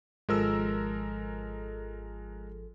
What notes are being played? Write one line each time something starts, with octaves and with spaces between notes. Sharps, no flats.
G#1 F3 G#3 A4 A#4 E6